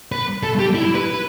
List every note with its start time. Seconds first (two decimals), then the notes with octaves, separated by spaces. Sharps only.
0.12 B4
0.43 A4
0.59 G4
0.75 E4
0.85 E4
0.95 B4